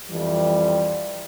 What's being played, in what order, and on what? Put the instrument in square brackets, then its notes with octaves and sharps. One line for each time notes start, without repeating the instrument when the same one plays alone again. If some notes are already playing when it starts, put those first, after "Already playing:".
[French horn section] F2 E3 G3